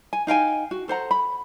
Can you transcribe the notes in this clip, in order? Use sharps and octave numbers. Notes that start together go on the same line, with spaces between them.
G#5
D#4 F5 G5 G#5
F#4
A4 C5 F#5 A#5
B5